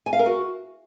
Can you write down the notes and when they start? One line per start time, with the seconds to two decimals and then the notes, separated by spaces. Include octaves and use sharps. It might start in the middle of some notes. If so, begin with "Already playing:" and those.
0.06 G#5
0.13 F5
0.19 A#4
0.26 F#4